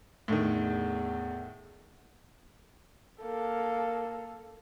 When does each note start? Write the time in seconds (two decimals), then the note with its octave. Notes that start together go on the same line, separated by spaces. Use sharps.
0.28 E2 A2 D3 D#3
3.22 A#3 A4